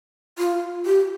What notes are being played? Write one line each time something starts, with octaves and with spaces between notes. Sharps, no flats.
F4
G4